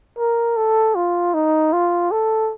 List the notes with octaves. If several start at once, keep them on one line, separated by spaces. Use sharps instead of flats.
A#4
A4
F4
D#4
F4
A4